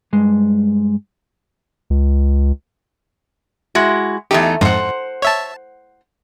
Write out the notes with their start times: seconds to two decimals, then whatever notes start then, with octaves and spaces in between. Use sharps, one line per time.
0.13 G2 G#3
1.90 C#2
3.75 G#3 E4 F#4
4.31 E2 A3 D#4 G4
4.61 F2 G#2 C5 F#5
5.22 C#5 E5 A5